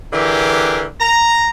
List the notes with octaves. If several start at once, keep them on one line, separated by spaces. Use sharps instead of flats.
D3 E3 G4 G#4 A#4
A#5